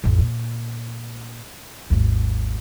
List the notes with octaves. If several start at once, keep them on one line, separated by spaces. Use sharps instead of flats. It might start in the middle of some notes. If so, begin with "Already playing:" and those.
A1 F2
A#2
G#1 D#2